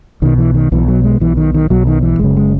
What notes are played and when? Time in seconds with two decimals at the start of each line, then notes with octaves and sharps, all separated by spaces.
0.22 B1 B2 D#3
0.38 E3
0.54 D#3
0.72 B1 B2 E3
0.88 F#3
1.04 G#3
1.20 B1 B2 E3
1.37 D#3
1.54 D#3
1.70 B1 B2 F#3
1.87 D#3
2.03 E3
2.19 F#1 F#2 C#3 G#3
2.37 G#3